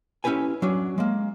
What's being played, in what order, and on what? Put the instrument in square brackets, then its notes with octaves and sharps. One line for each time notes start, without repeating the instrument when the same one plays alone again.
[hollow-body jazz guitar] C#4 E4 G4 B4 G#5
F#3 C#4 D4
G#3 A#3